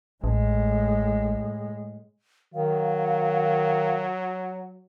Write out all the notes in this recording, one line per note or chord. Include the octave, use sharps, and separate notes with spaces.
A1 A2 G#3
D#3 F#3 F5